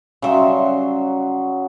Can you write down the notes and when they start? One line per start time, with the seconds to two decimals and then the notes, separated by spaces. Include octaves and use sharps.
0.22 C#3 F#3 G3 E5 C6